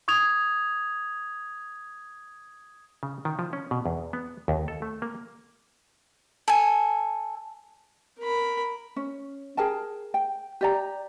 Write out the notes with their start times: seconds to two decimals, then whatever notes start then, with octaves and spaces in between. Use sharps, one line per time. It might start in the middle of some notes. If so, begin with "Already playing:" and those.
0.08 C#6 D#6 G#6 F7
3.03 C#3
3.25 D#3
3.39 F3
3.53 C#4
3.71 B2
3.86 E2
4.13 B3
4.48 D#2
4.68 A4
4.82 A3
5.02 A#3
6.48 A4 G#5
8.20 A#4 B5
8.96 C#4
9.57 G#4 A#4 G5 A5
10.14 G5
10.61 G4 D5 A#5